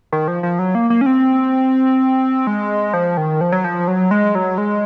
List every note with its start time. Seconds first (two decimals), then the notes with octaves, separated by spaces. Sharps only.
0.12 D#3
0.28 F3
0.43 F3
0.59 F#3
0.75 A#3
0.90 A#3
1.01 C#4
1.06 C4
2.47 G#3
2.93 F3
3.17 D#3
3.41 F3
3.52 F#3
3.64 F3
3.88 F#3
4.11 G#3
4.35 F#3
4.58 G#3